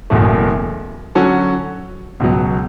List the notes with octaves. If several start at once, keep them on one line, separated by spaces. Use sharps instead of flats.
F#1 E2 B2 A3
D3 F#3 C#4 F#4 A4
C#2 B2 F#3